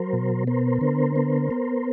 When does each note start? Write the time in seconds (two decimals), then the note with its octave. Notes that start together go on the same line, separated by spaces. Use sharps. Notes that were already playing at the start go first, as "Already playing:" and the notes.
Already playing: F#3 A#4 C5
0.13 B2
0.47 B3 A#4 C5
0.81 D3
1.16 B3
1.51 B3